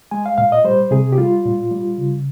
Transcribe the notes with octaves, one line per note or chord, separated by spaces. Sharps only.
G#3 G#5
F5
A#2 F5
D#5
G3 C5
C3 G#4
G4
G3 F4
A#2
G3
C#3